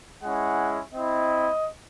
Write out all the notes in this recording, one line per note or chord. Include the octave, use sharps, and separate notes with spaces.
G#3 C#4 E4 F#5
C4 E4 D#5